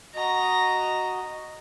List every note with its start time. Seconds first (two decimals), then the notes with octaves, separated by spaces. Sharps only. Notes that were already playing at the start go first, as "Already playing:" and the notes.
0.16 F#4 D#5 A#5